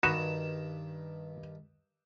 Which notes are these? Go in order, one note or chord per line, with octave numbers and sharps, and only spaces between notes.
G2 D#3 D#4 F#4 B4 E7